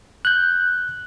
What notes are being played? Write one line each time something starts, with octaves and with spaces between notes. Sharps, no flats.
F#6 G6